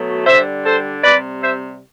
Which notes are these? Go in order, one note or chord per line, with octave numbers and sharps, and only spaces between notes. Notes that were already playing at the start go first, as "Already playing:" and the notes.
Already playing: B2 F#3 A3
D3 G3 C5 E5
A4 C5
C3 G3 B4 D5
C5 E5